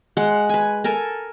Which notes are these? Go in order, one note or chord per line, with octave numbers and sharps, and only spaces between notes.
G#3 F#5 C6
B4 G#5
A4 A#4 G#5